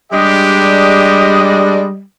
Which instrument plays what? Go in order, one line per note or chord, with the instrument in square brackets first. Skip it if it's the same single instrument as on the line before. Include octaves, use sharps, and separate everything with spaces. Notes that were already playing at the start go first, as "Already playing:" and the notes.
[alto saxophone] G3 [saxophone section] G#3 D4 [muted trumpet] G4 [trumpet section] D#5